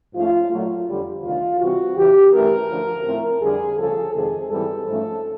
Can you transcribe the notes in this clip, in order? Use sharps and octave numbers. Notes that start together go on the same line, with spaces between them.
G#2 F3 A3 C#4 F4
A#2 F#3 A3
F2 D3 G3
D2 C3 D#3 F4
C3 E3 G3 C4 F#4
E2 C#3 E3 G4
G2 E3 A3 C#4 A#4
D2 D3 F3 A3
A2 F3 A3 C4
F2 D3 G3 G#4
D2 C#3 F3 A4
F2 C3 D#3 G#3 G#4
G#2 E3 G3 C4 A4
G#2 F3 A3 C#4